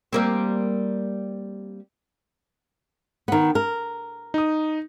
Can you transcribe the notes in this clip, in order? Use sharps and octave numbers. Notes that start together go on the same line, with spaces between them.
G3 A#3 C4
D#3 B3
A#4
D#4 D#6